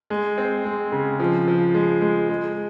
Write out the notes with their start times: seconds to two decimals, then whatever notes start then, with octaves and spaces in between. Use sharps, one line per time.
0.10 G#3
0.38 C4
0.65 G#3
0.92 C#3
1.20 F3
1.48 F3
1.75 G#3
2.01 G#3
2.29 G#3